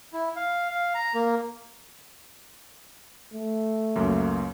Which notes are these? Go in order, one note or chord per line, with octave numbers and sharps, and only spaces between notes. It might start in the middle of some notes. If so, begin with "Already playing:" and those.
E4
F5
F5
A#5
A#3
A3
C#2 F#2 A#3